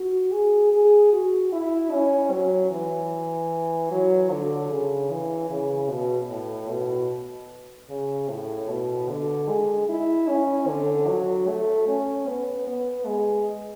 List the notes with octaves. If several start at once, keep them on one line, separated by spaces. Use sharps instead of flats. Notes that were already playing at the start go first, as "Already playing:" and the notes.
Already playing: F#4
G#4
G#4
F#4
E4
C#4
F#3
E3
F#3
D3
C#3
E3
C#3
B2
A2
B2
C#3
A2
B2
D3
G#3
E4
C#4
D3
F#3
A3
C#4
B3
B3
G#3